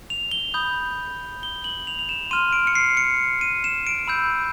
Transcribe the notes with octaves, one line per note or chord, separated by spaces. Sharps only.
F7
G7
B5 D#6 G6
G7
F#7
F7
F7
E7
C6 F6 D#7
D7
C#7
C7
C#7
D#7
E7
D7
B5 E6 G6